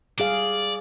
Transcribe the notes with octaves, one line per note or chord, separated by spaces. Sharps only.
G3 G#4 D5 F5